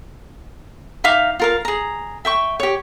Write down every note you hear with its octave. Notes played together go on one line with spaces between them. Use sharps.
D#4 E5 F5 D6
F4 A#4 F5
G#4 A#5
E5 G5 C#6
G4 C#5